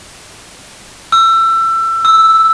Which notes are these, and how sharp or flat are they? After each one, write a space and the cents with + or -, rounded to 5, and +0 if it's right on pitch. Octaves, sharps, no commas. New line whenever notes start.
E6 +25
E6 +0